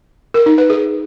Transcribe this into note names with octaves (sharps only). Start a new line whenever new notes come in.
A#4
D#4
B4
G#4